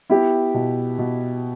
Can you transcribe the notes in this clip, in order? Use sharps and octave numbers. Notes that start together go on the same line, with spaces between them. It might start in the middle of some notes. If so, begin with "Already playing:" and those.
B3 E4 G4
B2
B2